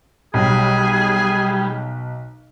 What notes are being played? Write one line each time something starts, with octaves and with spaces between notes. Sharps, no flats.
B1 G3 G#4